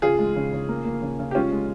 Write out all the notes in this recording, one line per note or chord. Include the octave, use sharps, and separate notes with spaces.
C#3 F4 G#4
G#3
C#3
C#3
A#3
A#3
C#3
C#3
G4
G#3 C#4 F4
G#3